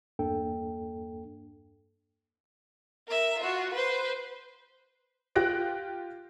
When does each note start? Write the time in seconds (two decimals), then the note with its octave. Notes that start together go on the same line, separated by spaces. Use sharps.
0.19 E2 G2 A#3 D4 A4 G5
3.08 A#4 E5
3.39 F4 F#4
3.74 B4 C5
5.36 F4 G4 F#6 A#6 D7